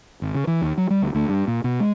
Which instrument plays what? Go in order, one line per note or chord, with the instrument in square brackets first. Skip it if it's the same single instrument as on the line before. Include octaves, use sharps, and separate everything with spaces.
[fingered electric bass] G#1
C#3
E3
D#2
F#3
G3
D2
D2
G2
A#2
B2
G#3